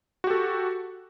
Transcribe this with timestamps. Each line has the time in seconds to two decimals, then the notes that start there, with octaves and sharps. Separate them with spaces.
0.24 F#4
0.27 G4
0.30 A4